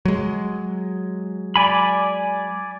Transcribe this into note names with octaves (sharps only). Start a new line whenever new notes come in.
F#3 G#3
D5 G#5 B5